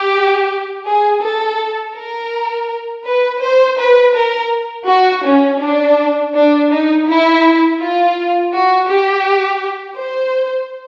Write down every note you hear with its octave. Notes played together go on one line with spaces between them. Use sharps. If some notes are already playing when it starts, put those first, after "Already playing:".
Already playing: G4
G#4
A4
A#4
B4
C5
B4
A#4
F#4
C#4
D4
D4
D#4
E4
F4
F#4
G4
C5